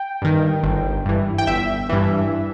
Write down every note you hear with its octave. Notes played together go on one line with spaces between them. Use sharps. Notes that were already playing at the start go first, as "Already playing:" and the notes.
Already playing: G5
G2 D#3
G1
G2 E3
G5
G1 E5
G2 E3